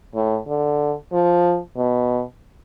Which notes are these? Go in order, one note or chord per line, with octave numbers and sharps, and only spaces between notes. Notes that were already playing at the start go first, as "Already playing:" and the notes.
A2
D3
F3
B2